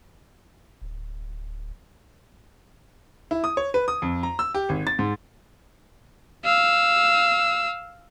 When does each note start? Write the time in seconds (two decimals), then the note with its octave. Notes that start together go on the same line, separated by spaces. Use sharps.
0.81 D1
3.31 E4
3.44 D#6
3.57 C#5
3.74 B4
3.88 D#6
4.02 F2
4.23 A#5
4.39 E6
4.54 G4
4.69 G#1
4.87 A6
4.99 G#2
6.45 F5 E6